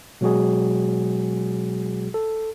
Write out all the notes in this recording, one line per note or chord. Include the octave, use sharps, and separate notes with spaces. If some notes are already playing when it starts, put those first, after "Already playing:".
B2 F#3 G#3 F#4 G#4
A4